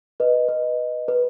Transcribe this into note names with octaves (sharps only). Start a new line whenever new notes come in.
B4 D#5
B4
B4